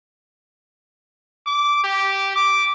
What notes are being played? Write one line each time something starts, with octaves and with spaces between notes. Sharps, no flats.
D6
G4
D6